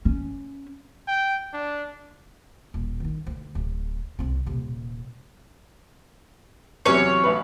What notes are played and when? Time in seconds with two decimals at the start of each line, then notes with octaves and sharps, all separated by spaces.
0.05 C#4
1.08 G5
1.54 D4
2.74 D#1
3.00 D#3 D#4
3.27 D2
3.55 D1
4.19 C2 C4
4.46 D#1 C3
6.86 E2 C3 F#3 C#4 C#5
7.24 A1 B4